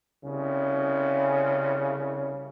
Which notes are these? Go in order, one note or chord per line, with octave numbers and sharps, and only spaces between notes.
C2 C#3